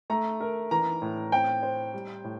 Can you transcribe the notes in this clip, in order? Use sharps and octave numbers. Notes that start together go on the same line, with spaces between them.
A3 A#5
A#4
E3 A#5
A2
C4 G5
C5
G3
A2